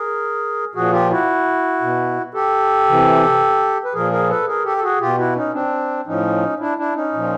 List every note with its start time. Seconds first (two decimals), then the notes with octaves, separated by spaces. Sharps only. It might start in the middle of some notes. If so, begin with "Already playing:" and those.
Already playing: G#4 A#4
0.75 A#2 F3 F#4 G#4
0.92 F4 G4
1.10 E4 F#4
1.81 B2
2.34 G4 A4
2.88 C3 E3
3.84 B4
3.94 A#2 F3 G#4 A#4
4.12 G#4 A#4
4.29 A4 B4
4.47 G#4 A#4
4.64 G4 A4
4.77 A4
4.82 F#4 G#4
5.00 B2 F4 G4
5.18 E4 F#4
5.35 C#4 D#4
5.53 C4 D4
6.06 A2 F3 C#4 D#4
6.60 D4 E4
6.78 D4 E4
6.95 C#4 D#4
7.13 A#2 F3